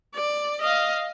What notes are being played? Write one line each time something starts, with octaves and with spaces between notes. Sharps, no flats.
D5
D#5 F5